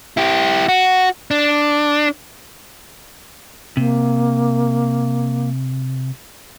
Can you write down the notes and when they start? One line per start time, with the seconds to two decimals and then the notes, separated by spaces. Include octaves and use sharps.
0.17 E4 G4
0.69 F#4
1.31 D4
3.77 C3 A#3